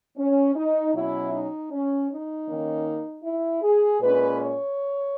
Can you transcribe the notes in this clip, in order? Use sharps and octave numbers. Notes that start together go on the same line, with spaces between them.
C#4
D#4
B2 F#3 C#4 E4
D#4
C#4
D#4
D#3 A#3 C#4
E4
G#4
A#2 G#3 C#4 B4
C#5